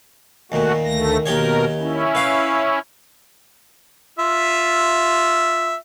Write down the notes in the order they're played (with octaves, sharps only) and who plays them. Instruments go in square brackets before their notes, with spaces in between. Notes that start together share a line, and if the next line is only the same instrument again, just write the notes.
[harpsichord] D#2 A#2 [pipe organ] A3 F#4
[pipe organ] D2 A3 A#6
[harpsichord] D#2 G4 C#5 [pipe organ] B2 A#4
[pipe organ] C#4 E4
[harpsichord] B4 F5
[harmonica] F4 E5